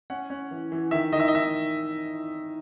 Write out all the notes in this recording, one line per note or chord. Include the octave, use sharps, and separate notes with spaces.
C#4 F#5
C#4
E3
E3
D#3 E5
D#3 D#5
E5
D#5
D#3 E5